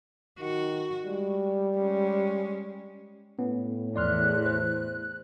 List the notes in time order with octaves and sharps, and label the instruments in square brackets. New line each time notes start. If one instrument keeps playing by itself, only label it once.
[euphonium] D#3 [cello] F#4
[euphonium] G3 [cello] G#3
[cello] G#3 C#4
[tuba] A2 [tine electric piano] B3 C#4
[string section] E2 [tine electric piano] D5 C6 F6 [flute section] F#6
[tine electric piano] C5